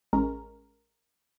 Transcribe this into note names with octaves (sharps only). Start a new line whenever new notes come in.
A1 G#3 C#4 A#4